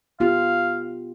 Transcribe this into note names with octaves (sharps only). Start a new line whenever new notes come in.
B3 F4 G4 F5